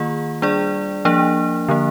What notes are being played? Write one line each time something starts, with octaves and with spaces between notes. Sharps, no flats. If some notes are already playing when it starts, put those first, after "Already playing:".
Already playing: D#3 A#3 F4 G#4
G3 D4 G#4 D5
F3 A#3 D4
D3 F3 A#3